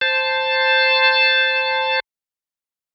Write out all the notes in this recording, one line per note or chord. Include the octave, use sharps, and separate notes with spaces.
C5 A5